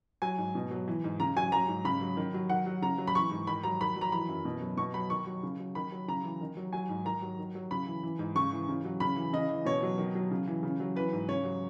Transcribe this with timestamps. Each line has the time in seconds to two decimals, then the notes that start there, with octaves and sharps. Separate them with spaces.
0.22 F#3 G#5
0.38 G#2
0.55 B2
0.71 F#3
0.88 E3
1.04 G#2
1.20 C#3 A#5
1.36 F#3 G#5
1.52 F#3 A#5
1.68 G#2
1.85 C#3 B5
2.01 F#3
2.17 D#3
2.34 F#3
2.50 D#3 F#5
2.66 F#3
2.82 C#3 A#5
2.98 F#3
3.07 B5
3.15 E3 C#6
3.31 G#2
3.47 D#3 B5
3.63 F#3 A#5
3.81 D#3 B5
3.96 F#3
4.01 A#5
4.12 E3 B5
4.29 F#2
4.45 B2
4.61 F#3
4.77 B2 C#6
4.94 F#3 B5
5.10 D#3 C#6
5.27 F#3
5.43 C#3
5.60 F#3
5.75 D#3 B5
5.92 F#3
6.08 C#3 A#5
6.24 E3
6.41 D#3
6.57 F#3
6.73 F#3 G#5
6.89 G#2
7.05 D#3 A#5
7.22 F#3
7.39 D#3
7.55 F#3
7.71 C#3 B5
7.87 E3
8.03 E3
8.19 G#2
8.35 C#3 C#6
8.52 E3
8.69 C#3
8.85 F#3
9.00 C#3 B5
9.16 E3
9.33 C#3 D#5
9.50 E3
9.65 B2 C#5
9.83 F#3
9.98 D#3
10.15 F#3
10.31 C#3
10.47 E3
10.63 C#3
10.80 F#3
10.96 E3 B4
11.13 G#2
11.28 C#3 C#5
11.45 F#3